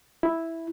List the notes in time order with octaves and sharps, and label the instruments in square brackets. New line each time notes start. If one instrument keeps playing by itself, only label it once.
[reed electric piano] E4